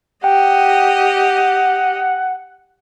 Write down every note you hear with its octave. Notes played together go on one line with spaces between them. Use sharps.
G4 D#5 F#5 G5